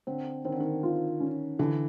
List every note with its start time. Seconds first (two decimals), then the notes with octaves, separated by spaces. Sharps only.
0.07 D3 C4
0.45 D#3 C4
0.52 D3
0.60 D#3
0.83 F4
1.20 C#4
1.59 D3 E3